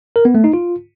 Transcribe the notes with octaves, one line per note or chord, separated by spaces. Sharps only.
A#4
B3
A3
D#4
F4